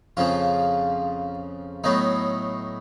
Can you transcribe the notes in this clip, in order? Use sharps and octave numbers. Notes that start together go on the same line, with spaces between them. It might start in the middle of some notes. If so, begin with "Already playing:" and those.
F2 C#3 F3 F4
A2 F#3 B3 D#4